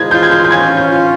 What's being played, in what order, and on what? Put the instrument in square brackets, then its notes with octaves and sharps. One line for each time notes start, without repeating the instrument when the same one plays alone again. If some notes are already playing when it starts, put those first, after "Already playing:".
Already playing: [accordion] G#3 [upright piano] G#6
[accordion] F4 [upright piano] G6
[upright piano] G#6
G6
G6
[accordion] C#4 [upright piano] G#6
[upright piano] G6
[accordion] F4